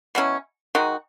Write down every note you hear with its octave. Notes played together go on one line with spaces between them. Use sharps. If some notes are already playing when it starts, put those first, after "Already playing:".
B2 F#3 C#4 E4
D#3 G#3 D#4 F#4